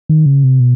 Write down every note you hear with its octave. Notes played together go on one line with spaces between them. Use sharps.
D#3
C#3
C3
B2